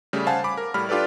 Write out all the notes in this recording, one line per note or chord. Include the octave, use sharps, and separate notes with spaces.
C#3 G3 A3
C5 F5 F#5 G#5 A5
B5 D6
A#4
A2 G3 B5 F6
D4 F4 G4 A4 B4 D5